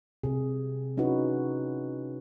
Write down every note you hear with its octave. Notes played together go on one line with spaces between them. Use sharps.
C3 G#4
C#4 D#4 E4 F#4 B4